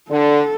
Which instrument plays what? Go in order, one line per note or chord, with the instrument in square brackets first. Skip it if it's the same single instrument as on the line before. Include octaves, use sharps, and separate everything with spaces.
[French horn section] D3 [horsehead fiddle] A4